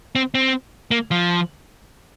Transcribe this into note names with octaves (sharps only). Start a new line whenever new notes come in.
C4
C4
A#3
F3